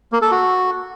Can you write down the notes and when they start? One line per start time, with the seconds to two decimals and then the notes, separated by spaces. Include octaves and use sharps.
0.12 A#3
0.22 A4
0.31 F#4